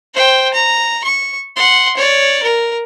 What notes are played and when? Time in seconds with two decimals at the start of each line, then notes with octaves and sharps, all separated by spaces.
0.14 C5 G5
0.54 A#5
1.04 C#6
1.56 F#5 C6
1.97 C#5 D5
2.42 A#4